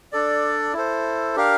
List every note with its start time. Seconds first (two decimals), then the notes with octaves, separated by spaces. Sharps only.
0.12 D4 A4 D5
0.73 E4 A4 C5
1.36 D4 G4 A#4 F5